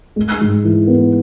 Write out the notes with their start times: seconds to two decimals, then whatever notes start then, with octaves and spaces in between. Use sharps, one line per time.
0.16 G#3
0.41 G#2
0.64 E3
0.87 B3